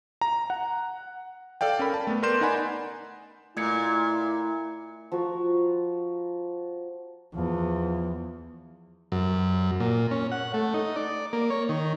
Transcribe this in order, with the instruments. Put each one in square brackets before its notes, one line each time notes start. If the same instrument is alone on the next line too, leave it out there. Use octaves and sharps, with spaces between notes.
[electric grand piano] A#5
F#5
A4 D5 F5 G5
C#4 A#4 B5
A5
A3 B3
A#4 B4 D5 C6 G6 E7
D#4 D5 F#5 G#5 B5
[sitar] A#2 [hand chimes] A3 G#6 C#7 [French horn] E4
[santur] F3 F#4 A#5 C#6
[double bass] E2 [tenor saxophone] F3
[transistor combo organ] F#2
A#2
C#4
F#5
A3
D#4
D5
A#3
C#5
D#3